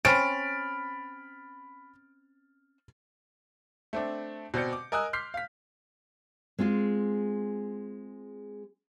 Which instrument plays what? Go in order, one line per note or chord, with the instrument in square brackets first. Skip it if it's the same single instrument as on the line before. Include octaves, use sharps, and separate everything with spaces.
[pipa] C4 C#4 [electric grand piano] B5 F6 A6 [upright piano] D7
[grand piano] A3 C4 D4
B2 C4 D5 G6 C#7
D6
A#4 D#5 G#5 D#6 E6 F#6
C6 D6 F6 G6 B6 C7
F5 B6
[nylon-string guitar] G#3 C4 F4 G#4